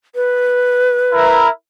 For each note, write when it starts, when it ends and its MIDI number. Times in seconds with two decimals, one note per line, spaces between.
0.15 1.37 71
1.13 1.49 64
1.13 1.49 70